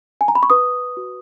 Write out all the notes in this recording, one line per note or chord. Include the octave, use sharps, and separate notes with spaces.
G#5
A#5
B5
C#6
B4 D#6
F#4